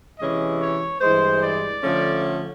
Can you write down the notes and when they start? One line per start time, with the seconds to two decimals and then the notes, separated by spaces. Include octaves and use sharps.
0.19 C3 E3 G#3 C#4 D#5
0.60 C#5
1.01 G2 E3 G#3 C5
1.43 D5
1.83 D3 F3 A3 C#4